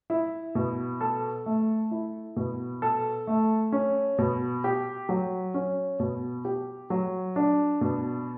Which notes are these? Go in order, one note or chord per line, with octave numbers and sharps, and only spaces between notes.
E4
B2
A4
A3
E4
B2
A4
A3
C#4
B2
G4
F#3
C#4
B2
G4
F#3
D4
B2